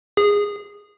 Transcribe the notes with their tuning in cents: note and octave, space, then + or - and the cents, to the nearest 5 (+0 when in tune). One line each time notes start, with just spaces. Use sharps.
G#4 -15